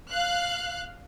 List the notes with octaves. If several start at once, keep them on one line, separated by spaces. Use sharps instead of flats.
F5 F#6